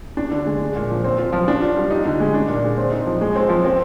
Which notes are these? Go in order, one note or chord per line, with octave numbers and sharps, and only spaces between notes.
D4
D3
G#3
G#3
A#2
F3
C4
F4
F3
D4
F4
G3
D#4
D3
G#3
D4
A#2
G#3
C4
D#4
F3
G#3
C4
F3
C4